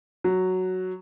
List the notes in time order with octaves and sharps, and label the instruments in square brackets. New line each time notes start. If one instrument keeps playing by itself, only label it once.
[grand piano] F#3